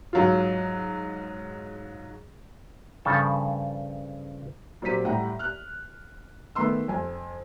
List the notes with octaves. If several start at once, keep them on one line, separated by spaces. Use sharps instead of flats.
G#2 F#3 F4
G2 C#3 F3 A4
A#2 F#3 C4 G4 B6 D#7
A2 G3 F#5 G5 A#5
F6 F#6
D#3 A3 B3 C6 E6
F2 G#5